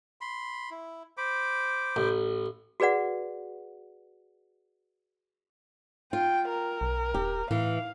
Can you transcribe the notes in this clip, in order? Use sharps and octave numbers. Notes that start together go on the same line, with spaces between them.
B5 C6
E4
C5 B5 D6
A1
F#4 G#4 B4 D5 F#5
F4 G5
A#4
B1
D#1 G4
A2 E3 F5